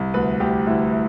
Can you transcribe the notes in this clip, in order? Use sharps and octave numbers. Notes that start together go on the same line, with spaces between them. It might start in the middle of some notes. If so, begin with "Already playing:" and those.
Already playing: C2
D2 B4
D2 G4
D2 E4
E4